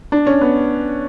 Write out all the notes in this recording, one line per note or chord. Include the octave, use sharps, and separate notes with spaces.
D4
C#4
B3